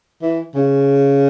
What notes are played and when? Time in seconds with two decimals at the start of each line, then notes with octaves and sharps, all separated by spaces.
0.22 E3
0.55 C#3